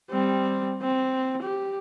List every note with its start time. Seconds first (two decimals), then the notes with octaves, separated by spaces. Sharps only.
0.10 G3 C4
0.82 C4
1.42 G4